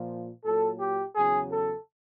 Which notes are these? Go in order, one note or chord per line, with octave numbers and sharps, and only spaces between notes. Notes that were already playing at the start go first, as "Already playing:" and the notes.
Already playing: A#2 F3
A#2 F#3 A4
G4
E2 C#3 F#3 G#4
A4